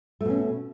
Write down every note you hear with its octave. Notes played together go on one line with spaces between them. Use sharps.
B2 A3 C#4